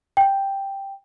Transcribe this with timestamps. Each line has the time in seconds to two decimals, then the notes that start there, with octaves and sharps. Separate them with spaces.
0.17 G5